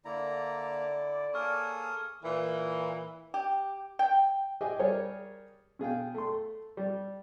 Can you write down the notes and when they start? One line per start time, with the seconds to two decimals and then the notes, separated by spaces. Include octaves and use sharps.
0.05 D3 A#3 E4 D5 A#5
1.34 A#3 G#4 A4 C#5 C#6 D#6 F6
2.23 A#2 E3
3.34 G4
3.99 G5
4.61 G4 G#4 D#5 E5 G5 G#5
4.79 G3 G#4 A#4 C#5
5.79 B2 G#4 F5 G5
6.15 A3 C6
6.77 G3